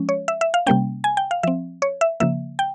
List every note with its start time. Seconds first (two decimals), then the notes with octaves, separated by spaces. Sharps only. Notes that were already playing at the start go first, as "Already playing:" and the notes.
Already playing: F3 G#3 C#4
0.09 C#5
0.28 E5
0.41 E5
0.54 F5
0.66 C3 G3 A#3 C#4 G5
1.04 G#5
1.17 G5
1.31 F5
1.43 F3 C4 E5
1.82 C#5
2.01 E5
2.20 C#3 F3 A#3 E5
2.59 G5